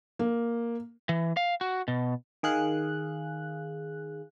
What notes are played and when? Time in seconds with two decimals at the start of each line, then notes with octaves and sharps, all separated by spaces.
0.19 A#3
1.09 E3
1.37 F5
1.61 F#4
1.88 B2
2.43 D#3 G#4 F5 F#6